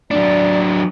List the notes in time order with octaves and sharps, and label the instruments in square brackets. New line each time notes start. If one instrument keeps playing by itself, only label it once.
[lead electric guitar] F#3 D4 [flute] D5